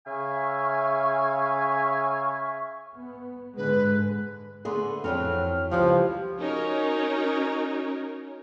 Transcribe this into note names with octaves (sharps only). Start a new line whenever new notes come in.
C#3 E5 F5 G#5 C#6
B3
G#2 D3 G#3 B4
D3 A3 B3 G#4 C6
F2 E3 F#3 C4 A4 F6
C#2 E3 F3 G3 F4 G4
C#4 D#4 F#4 A#4 C#5